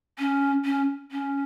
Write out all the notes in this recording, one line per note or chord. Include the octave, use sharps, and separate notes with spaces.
C#4
C#4
C#4